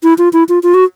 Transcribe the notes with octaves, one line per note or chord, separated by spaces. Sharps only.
E4
F4
E4
F4
F4
F#4